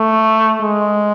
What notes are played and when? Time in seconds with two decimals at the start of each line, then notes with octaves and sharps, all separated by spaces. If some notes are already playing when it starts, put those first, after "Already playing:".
Already playing: A3
0.61 G#3